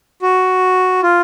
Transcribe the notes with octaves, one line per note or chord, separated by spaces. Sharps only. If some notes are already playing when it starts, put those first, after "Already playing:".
F#4
F4